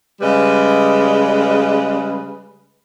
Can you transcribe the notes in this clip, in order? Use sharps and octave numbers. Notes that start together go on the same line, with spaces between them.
C#3 G3 G#3 B4